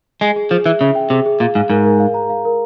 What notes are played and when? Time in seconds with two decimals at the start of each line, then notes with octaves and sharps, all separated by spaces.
0.21 G#3 G#4
0.36 G#4
0.50 F3 G#4
0.66 E3 E5
0.81 C#3 E5
0.95 G5
1.10 C3 G#4
1.26 G#4
1.40 A#2 F5
1.55 G#2 F5
1.70 G#2 A#4
1.85 A#4
2.00 F5
2.14 A#5
2.30 F5
2.45 A#4